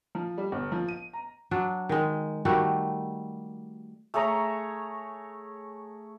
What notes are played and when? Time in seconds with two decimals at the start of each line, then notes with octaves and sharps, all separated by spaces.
0.15 F3
0.38 G3
0.52 G1
0.72 F3
0.89 D#7
1.13 A#5
1.51 F#3 D4
1.89 D#3 G#3
2.45 D#3 G3 A3 F#4
4.14 A3 G#4 C#5 A#5